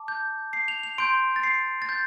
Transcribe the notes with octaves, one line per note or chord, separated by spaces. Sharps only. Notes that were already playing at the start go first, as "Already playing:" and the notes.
Already playing: A5 D6
G6
C7
F7
F7
C6 G6 D7
A6
C7
A6
G6